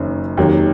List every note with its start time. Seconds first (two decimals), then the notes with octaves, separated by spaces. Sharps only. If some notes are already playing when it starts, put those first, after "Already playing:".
Already playing: F#1 F#2 D#3
0.37 F1 D#2 D#3 F#3